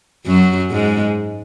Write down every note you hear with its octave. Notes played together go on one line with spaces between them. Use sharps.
F#2 F#3
G#2 G#3